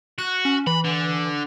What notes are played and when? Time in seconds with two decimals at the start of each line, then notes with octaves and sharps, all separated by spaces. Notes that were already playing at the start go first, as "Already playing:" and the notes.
0.18 F#4 F#6
0.45 C#4
0.67 E3 B5
0.84 D3